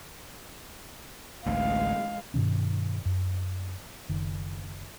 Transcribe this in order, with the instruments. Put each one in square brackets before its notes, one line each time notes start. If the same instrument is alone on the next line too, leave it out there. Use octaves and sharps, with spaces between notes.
[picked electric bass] A1 D2 [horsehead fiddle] G#3 F5
[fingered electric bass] G2 B2 D#3 C#4
F#2
F#1 D#3